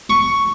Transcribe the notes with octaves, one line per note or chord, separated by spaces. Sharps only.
C#6